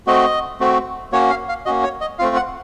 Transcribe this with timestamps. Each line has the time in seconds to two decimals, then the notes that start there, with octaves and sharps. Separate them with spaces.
0.07 A3 C4 F#4 D#5
0.60 A3 C4 F#4
1.12 A#3 C#4 F#4 C#5
1.30 F5
1.49 F5
1.65 A#3 C#4 F#4 D#5
1.84 C#5
2.01 D#5
2.19 A3 C4 F4 F5
2.36 F#5